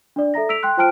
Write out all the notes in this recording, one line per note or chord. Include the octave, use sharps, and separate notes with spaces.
D4 D5
A4 E5 A#5 A#6
E6 B6 D7 F7
G5 C6 F#6
F4 C5 G5 A5 F6 D7